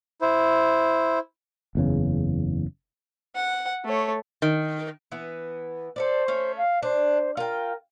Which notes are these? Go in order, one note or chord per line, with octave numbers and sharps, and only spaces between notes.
E4 C5
F#1 E2 C#3
F#5
A3 C#5
D#3
E3 B3
A4 B4 C5 D5
A3 C#4
F5
D4 C5
F4 A#4 G5